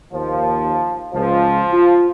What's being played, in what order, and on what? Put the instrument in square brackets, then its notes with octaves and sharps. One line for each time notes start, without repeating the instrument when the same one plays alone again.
[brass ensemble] D#2 [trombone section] F3
[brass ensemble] C#2 [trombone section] F3
[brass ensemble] F4